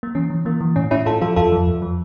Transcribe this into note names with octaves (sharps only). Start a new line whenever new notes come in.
A#3
E3 C#4
E3
E3 A#3
E3
A2 C#4
A2 C#4 E4
A2 F4 A4
F3 F4 A4
F2 F4 A4
F3
F2
F3